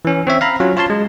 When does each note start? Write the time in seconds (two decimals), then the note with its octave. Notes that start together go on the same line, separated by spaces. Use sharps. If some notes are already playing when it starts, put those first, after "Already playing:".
0.05 E3 C#4
0.27 C4 C#5 E5
0.41 F5 A#5 B5
0.60 F#3 C#4 F4
0.77 F4 C#5 F5 A5 C6
0.90 G#3